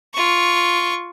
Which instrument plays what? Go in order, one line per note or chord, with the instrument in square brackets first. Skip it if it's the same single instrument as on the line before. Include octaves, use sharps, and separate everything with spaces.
[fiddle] F4 C#6